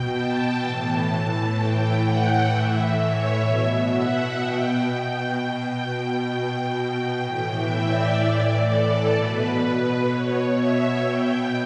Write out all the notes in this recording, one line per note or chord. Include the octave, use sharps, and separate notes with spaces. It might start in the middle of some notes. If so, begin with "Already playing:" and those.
Already playing: B2 G5
A5
A2 E3
A2 E3 G5
F#5
A2 E3 E5
C#5
B2 E5
F#5
B2 G5
G5
B2
B2
A2 E3 G5
E5
D5
A2 E3 D5
A4
B2 B4
B4
B2 C#5
E5
B2 G5